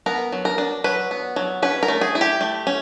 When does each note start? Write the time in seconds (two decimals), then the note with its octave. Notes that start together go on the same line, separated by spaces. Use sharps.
0.06 B3 A#4
0.32 F#3
0.45 A#4
0.58 D4
0.84 F#3 B4
1.11 B3
1.36 F#3
1.62 C#4 B4
1.83 A#4
1.88 A3
2.01 G#4
2.15 E4
2.21 G4
2.41 A3
2.67 C#4